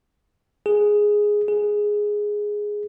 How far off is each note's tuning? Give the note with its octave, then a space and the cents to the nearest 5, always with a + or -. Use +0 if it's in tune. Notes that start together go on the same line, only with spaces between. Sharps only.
G#4 +0
G#4 +0